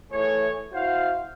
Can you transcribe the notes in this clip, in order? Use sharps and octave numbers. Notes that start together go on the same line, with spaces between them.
E3 A3 G#4 C#5
E4 F#4 C5 F5